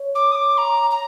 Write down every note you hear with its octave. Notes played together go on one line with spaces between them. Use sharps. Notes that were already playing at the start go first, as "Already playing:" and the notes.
Already playing: C#5
D6
D#6
D6
A#5
A#5